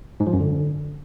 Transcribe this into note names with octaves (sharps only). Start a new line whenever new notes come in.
G#2
F3
F#2
D3